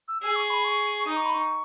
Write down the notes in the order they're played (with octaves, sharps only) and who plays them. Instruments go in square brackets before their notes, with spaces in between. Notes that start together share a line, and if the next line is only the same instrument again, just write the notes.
[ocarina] E6
[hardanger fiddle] G#4 [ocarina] E6
[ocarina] C#6
B5
C#6
[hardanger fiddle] D#4 [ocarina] D#6
[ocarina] C#6
B5
C#6